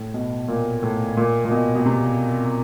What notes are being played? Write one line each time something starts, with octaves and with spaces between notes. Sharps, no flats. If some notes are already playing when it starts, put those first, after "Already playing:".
Already playing: A2
B2
A#2
A2
A#2
A#2
B2
B2
C3